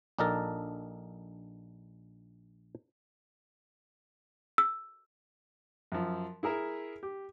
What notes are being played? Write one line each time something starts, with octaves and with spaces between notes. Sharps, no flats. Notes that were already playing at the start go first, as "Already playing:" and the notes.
A#1 D4 D#4 A4 A#4 A5
E6
F#2 F3
E4 G#4 A#4 E5
G4